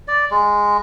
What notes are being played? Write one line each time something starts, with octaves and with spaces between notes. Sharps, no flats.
D5
G#3